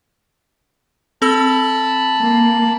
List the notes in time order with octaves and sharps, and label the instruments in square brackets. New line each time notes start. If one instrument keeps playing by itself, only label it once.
[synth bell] C4 A4 E6 [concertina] A5 B5
[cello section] A#3